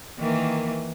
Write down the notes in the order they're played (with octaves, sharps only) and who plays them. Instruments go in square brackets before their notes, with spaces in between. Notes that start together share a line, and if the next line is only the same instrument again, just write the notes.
[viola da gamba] D#3 E3 A#3